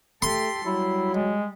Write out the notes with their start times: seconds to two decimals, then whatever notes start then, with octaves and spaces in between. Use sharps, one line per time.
0.22 A3 G4 A4 C6
0.66 F#3 G3 E4
1.15 G#3